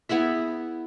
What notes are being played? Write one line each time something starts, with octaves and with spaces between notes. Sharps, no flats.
B3 E4 G#4 E5